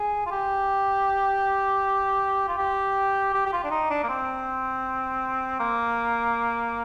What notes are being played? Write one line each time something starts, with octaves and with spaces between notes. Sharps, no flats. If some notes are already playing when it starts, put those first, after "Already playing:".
Already playing: G#4
F4
G4
F4
G4
G4
G4
F4
D4
D#4
D4
A#3
C4
A#3